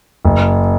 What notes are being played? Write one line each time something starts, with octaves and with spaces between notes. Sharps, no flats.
F#1